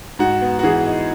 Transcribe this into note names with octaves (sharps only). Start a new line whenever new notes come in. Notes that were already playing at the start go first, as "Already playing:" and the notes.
G#2 F#4
B3
F#4
E3 G#4
D#4